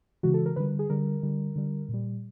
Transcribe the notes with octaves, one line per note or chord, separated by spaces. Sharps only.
C#3 E3 G#3 F#4
A4
A#4
D3 G3 B4
G#4
D3 G3 A#4
D3 G3
D3 G3
A#2
G3